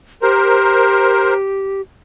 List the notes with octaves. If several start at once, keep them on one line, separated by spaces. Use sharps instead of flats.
G4 A#4 C5